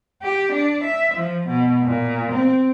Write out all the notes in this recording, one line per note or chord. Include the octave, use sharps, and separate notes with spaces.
G4
D4
E5
F3
B2
A#2
C4